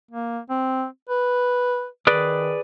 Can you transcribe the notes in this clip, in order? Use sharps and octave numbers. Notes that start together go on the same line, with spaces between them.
A#3
C4
B4
D#3 G#4 B4 D5